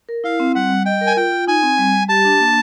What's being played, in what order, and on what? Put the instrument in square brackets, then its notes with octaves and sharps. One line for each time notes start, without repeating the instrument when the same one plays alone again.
[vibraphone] A#4
[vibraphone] E4 [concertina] F5
[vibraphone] C4
[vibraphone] G3 [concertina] F#5
[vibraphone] G3
[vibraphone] D#5 [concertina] G5
[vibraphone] A#4
[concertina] G#5
[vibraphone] F4 [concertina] G5
[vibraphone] F4
[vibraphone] D#4 [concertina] G#5
[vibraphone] C4
G3
G3
[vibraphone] G4 [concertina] A5
[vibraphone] D4
A#3